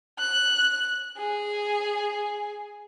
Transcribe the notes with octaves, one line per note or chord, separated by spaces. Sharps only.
F#6
G#4